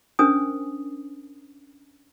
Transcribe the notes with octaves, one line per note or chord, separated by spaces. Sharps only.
C#4 D4 A#4 C5 G#5 D#6